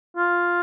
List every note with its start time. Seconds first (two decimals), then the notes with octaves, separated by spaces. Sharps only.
0.17 F4